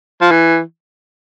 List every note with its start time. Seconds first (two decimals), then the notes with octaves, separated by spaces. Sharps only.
0.21 F3
0.31 E3